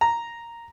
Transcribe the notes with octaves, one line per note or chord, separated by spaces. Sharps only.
A#5